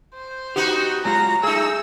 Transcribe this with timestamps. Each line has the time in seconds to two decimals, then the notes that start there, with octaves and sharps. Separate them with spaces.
0.15 C5
0.56 B3 D#4 F#4 G4
1.05 F#3 G#3 F4 A#5
1.43 A3 D#4 G#4 E6